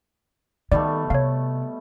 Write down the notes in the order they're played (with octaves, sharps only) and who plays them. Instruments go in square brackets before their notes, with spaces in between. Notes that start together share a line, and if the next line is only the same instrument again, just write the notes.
[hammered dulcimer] B2 G3 A3 [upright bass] D#3 [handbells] D5
[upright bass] C3 [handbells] C#5 F5